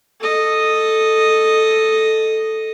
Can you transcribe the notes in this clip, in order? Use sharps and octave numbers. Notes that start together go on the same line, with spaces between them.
A4 D#5